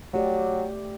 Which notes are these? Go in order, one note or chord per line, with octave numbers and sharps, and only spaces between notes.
F#3 A3 G4 D5